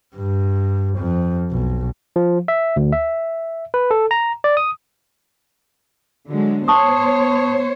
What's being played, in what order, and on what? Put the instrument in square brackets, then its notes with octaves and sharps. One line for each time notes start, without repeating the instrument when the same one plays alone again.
[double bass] G2
F2
B1
[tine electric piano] F3
E5
D2
E5
B4
A4
A#5
D5
D#6
[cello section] D3 F#3 G#3
[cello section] B3 C5 C#5 [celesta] A5 C#6 D#6